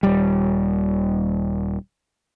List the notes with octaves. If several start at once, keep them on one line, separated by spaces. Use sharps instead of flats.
D#1 G3